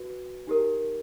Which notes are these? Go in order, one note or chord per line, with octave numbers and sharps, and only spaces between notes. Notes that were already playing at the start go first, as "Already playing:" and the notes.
Already playing: F#4 B4
D#4 G4 A#4